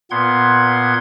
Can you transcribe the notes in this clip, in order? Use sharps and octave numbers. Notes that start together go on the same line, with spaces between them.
A#2 B3 F#5 C6 G#6